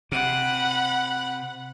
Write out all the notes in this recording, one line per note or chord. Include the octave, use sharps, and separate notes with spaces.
C3 F#5 B5